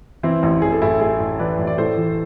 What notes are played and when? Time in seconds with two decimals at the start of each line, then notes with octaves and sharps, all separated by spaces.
0.23 E3 C4 E4
0.43 A1
0.62 A1 G#4
0.72 A4
0.82 A2 E4 G#4
1.01 A1 E4 G#4
1.20 A1
1.39 E3 B4 D5
1.59 A1
1.67 D5
1.78 A2 A4 C5
1.98 E3